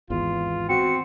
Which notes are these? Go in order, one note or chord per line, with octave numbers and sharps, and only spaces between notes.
G#1 E2 F4
C4 F#4 C#7